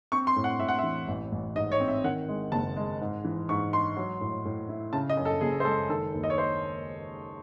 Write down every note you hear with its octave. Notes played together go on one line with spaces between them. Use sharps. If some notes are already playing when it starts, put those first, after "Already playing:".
C4 C#6
C6
A2
F#5
A2 E5
F#5
E3 E5
A1
A1
G#2 D#5
C#5
C4
E5
D#3 F#5
G#3
F#1 A5
G#3
G#2
E3
G#2 C#6
G#3 C6
F#3
A2
A2
E4
C#3 A5
D#5
F#2
A4
F#1 G#4
C5
G#3 A4
D#3 A4
D#2
D#5
C#5
C5